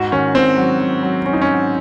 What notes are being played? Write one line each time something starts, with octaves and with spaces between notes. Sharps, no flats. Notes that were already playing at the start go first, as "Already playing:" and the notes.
Already playing: G#2 F#4
D#3 C#4
G#2 C4
F#3
F#3
F#3
F#3 C#4
D#4
C#4
G#2